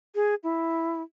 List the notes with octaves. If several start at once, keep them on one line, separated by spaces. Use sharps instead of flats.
G#4
E4